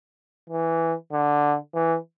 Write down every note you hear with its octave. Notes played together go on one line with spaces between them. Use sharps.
E3
D3
E3